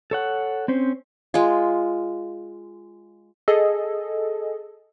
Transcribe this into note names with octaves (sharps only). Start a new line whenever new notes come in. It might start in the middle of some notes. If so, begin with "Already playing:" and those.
A4 C#5 F#5
C4 C#4 C5
G#3 F4
G#4 A4 D#5